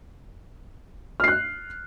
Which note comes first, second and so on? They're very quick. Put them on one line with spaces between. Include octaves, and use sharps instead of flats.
F6 C7 F#6